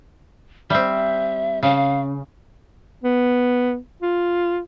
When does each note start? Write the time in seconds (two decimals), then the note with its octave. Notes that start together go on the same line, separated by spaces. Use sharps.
0.70 G3 C4 E5
1.63 C#3 F5
3.03 B3
4.02 F4